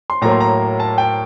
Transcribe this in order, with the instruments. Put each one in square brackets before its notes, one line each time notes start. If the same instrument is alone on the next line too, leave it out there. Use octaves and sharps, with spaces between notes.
[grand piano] C6
A2 F#3 A#3 A#5
C6
A#5
A5
G5